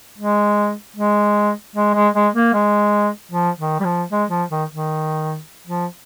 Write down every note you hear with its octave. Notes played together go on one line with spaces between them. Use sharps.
G#3
G#3
G#3
G#3
G#3
A#3
G#3
F3
D#3
G3
F3
G#3
F3
D#3
D#3
F3